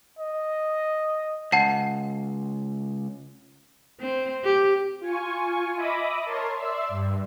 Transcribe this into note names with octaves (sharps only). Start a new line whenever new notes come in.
D#5
C#2 F#5 A5 C7
C4
G4
F4 G#5 C#6
D#5 E5 B5 D6 D#6
A#4 C#5 A5 C6
D5 E5 C6 E6
G2